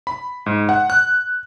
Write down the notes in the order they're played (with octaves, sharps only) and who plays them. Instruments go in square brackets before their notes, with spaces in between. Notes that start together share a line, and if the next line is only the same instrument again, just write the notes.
[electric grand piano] B5
G#2
F#5
F#6